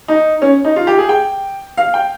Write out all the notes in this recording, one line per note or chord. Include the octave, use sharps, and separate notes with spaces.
D#4
C#4
D#4
F4
G4
G#4
G5
F5
G5